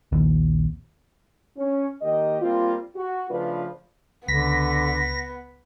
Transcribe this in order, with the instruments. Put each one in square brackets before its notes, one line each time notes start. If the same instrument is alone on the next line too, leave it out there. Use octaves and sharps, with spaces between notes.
[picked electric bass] A#1 D#2
[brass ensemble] C#4
D#3 A#3 G4 D#5
G3 A#3 C4 F4
F#4
C#3 F3 A3 D4 F4 B4
[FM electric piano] C#2 B6 [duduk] D3 [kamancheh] B3 [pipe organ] A#6